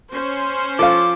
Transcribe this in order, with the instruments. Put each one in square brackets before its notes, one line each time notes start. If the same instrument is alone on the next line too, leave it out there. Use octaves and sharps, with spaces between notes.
[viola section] C#4 C5
[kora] F3 F4 [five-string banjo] A4 F5 [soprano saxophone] D6